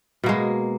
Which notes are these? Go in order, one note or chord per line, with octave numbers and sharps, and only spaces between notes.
B2 G#3 A#3